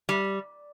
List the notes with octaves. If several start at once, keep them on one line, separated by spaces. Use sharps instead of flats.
G3